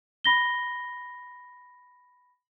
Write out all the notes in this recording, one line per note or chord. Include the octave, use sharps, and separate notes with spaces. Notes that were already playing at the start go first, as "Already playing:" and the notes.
B5 A#6 G7